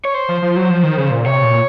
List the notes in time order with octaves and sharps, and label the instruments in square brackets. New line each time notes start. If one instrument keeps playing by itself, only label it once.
[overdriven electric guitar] C#5
C5
[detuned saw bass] F3
F3
F#3
F3
D#3
C#3
A#2
[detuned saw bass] C3 [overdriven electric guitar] C#5
[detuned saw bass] A#2